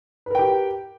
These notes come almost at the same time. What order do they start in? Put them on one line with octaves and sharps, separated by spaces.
B4 A#4 G5 G4